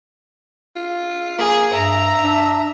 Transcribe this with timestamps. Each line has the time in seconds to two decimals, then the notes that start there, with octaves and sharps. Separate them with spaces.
0.76 F4
1.38 A#3 G#4
1.73 G2 E5 A#5
2.24 D4